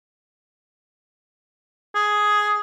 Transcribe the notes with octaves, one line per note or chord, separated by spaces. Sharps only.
G#4